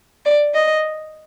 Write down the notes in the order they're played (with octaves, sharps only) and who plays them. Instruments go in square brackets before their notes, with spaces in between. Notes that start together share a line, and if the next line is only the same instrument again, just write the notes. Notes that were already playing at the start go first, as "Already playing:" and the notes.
[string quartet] D5
D#5